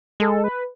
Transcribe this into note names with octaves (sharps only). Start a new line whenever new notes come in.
G#3 A4
B4